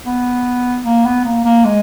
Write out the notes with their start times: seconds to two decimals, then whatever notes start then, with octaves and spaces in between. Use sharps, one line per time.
0.06 B3
0.85 A#3
1.06 B3
1.25 A#3
1.45 A#3
1.65 G#3